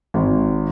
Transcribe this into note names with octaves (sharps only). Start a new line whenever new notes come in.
G#1